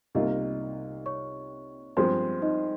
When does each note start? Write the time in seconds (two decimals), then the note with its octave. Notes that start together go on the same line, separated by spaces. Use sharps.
0.15 C2 C3 G3 A#3 D#4 F4 D#5
1.06 C#5 C#6
1.97 G2 F3 G#3 C4 C5 C6
2.42 D#4 D#5